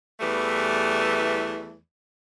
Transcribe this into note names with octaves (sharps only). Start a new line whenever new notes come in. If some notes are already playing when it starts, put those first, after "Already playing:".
E2 E3 G3 A3